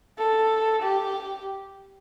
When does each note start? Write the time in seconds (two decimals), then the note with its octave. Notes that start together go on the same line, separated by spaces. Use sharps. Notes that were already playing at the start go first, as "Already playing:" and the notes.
0.18 A4
0.83 G4